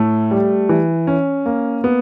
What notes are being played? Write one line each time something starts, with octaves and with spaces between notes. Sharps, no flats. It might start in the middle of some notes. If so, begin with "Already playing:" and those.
Already playing: A2 A3
G3
E3
C#4
A#3
B3